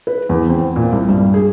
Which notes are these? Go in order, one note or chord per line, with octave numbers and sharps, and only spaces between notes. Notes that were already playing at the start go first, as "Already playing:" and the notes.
B4
E2
C4
A#2
C2
G2
G#4